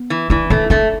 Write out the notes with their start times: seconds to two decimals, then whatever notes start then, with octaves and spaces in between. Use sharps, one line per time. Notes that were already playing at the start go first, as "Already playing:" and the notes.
Already playing: B3
0.10 E3
0.30 E3 D4
0.50 A3 D4
0.70 A3 D4